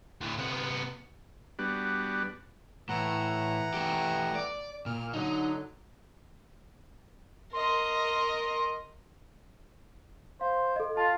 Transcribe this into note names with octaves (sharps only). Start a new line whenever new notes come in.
D2 A2
C3 B3
G3 B3 D4 F#4
A2 E3 F#5 A#5
A3 G4
D5
A#2 F6
D3 F#3 D#4
A#4 D#5 C6
C5 F5
A4 D#5
F4 A5